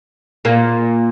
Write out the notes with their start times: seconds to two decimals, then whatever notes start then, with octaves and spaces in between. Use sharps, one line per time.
0.45 A#2 A#3